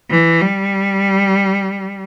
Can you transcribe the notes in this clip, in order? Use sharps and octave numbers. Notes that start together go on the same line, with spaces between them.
E3
G3